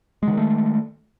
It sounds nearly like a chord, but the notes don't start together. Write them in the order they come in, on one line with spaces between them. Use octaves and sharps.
G#3 D3 D#3 A3